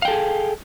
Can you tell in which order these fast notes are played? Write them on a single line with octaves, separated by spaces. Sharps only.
F5 G5 A4 G#4